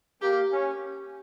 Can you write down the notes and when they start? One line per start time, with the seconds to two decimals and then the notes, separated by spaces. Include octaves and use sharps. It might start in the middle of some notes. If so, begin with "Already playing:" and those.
0.22 A#3 G4
0.52 C#4